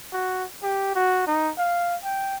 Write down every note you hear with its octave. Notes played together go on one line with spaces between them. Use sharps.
F#4
G4
F#4
D#4
F5
G5